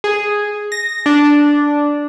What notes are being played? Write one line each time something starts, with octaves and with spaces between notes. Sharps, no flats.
G#4
A#6
D4